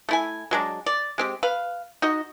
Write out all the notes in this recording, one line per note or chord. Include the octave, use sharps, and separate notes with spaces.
A3 E4 G#5
F#3 G#3 D4
D5
G#3 C4 G4
B4 F5
D#4 F#4 D#5